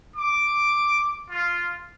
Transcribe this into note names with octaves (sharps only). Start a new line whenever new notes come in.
D6
F4